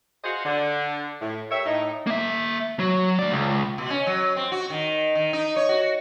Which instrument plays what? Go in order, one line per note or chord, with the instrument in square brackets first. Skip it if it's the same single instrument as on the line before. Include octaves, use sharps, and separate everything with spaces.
[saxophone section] F#4 G#4 C5 D#5 F5 F#5
D3
A2
G4 A#4 C#5 E5
A2 D#4
[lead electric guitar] A#3 E5
F#3
A3 D5
C#2
[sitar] B2
C#4
F#3
C4
F#4
D#3
D#3
D#4
C#5
F#4